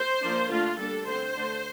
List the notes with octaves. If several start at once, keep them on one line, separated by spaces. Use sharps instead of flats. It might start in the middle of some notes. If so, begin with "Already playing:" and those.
Already playing: C5
F3 A#3 D4
D3 A3 D4 F4
G3 A#3 D4 A4
D3 A3 C4 C5
D3 A3 D4